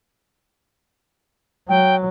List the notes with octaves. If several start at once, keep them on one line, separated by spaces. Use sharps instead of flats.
F#3 G5